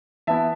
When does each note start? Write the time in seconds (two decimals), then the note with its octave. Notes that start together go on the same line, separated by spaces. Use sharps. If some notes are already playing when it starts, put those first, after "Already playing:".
0.27 E3 B3 E4 E5 A5